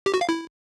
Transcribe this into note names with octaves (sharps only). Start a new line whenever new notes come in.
G4
F#4
F5
E4